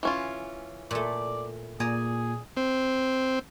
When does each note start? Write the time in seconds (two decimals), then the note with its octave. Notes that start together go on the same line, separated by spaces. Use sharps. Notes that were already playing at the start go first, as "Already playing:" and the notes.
0.03 E3 C#4 F4
0.91 A#2 A3 D5
1.80 A#2 G#4 D5 G#5 A#5
2.57 C4